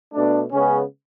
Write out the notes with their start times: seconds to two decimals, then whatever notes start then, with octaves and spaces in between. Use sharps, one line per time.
0.14 B2 A3 D4
0.52 C#3 G#3 B3 C#4